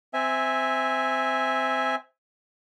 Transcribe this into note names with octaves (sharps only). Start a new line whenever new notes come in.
C4 E5 G#5